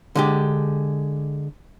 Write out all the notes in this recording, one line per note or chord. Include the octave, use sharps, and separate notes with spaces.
D3 G#3 G4